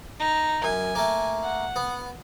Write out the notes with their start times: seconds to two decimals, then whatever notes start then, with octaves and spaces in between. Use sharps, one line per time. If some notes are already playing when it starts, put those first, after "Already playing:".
0.19 D#4
0.64 F#2 G#5
0.95 A3 A#3
1.44 F#5
1.76 B3